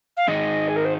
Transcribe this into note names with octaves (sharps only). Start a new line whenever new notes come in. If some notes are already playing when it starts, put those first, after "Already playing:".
F5
G#2 D#3 G#3 D#4 D#5
G#4
A#4
C5